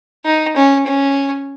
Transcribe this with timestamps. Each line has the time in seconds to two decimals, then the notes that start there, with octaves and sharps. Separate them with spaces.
0.25 D#4
0.56 C#4
0.87 C#4